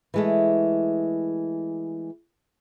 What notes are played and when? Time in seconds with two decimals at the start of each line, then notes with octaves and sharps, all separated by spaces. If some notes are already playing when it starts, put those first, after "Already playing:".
0.14 E3 G#3 A3